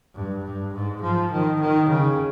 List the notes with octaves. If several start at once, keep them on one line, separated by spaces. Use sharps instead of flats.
G2
G2
G#2
F3
D#3
D#3
C#3